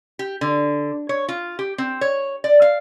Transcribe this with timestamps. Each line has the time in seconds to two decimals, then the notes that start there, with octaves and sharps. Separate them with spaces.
0.19 G4
0.41 D3
1.09 C#5
1.29 F4
1.59 G4
1.78 C4
2.01 C#5
2.44 D5
2.62 F5